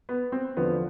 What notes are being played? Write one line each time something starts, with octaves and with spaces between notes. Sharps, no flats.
B3
C4
E2 D3 F3 B3